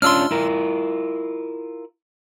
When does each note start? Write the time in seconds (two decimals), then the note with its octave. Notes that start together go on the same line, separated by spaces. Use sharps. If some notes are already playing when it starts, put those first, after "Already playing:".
0.02 C#4 D4 F4 C6 E6 F6
0.31 E4 F4 A#4